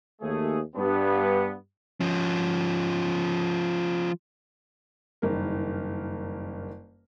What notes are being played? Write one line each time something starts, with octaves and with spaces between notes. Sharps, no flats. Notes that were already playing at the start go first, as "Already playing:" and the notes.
D#2 A3 G#4
G2 B3
F3 C#4
F#1 G2 D#3 A#4